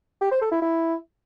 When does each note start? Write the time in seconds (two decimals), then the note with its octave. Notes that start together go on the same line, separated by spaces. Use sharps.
0.21 G4
0.31 C5
0.41 A4
0.52 E4
0.62 E4